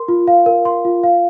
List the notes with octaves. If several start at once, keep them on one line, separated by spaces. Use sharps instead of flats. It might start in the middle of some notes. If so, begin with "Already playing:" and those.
Already playing: A#4 C6
F4
F5
A#4
C6
F4
F5